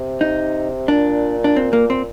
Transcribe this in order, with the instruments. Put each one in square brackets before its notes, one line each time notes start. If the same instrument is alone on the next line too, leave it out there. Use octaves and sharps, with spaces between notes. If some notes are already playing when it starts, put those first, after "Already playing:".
Already playing: [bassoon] C3
[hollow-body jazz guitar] D#4
[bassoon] A#2 [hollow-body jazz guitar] D4
[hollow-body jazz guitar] D4
C4
A#3
C4